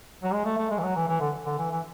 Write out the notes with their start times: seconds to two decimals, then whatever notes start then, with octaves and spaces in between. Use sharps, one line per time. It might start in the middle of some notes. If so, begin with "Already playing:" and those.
0.23 F#3
0.33 G#3
0.45 A3
0.58 A3
0.70 G#3
0.78 E3
0.83 F#3
0.96 E3
1.08 E3
1.20 D3
1.46 D3
1.58 E3
1.71 E3